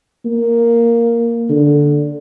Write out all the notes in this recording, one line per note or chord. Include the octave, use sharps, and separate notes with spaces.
A#3
D3